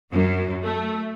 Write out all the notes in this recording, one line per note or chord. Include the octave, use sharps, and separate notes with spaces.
F#2
A3